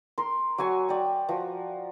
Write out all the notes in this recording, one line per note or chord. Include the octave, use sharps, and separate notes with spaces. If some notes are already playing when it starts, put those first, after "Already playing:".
A#4 C6
F#3 F#4 G#5 C#6
D5 G5
F3 F#4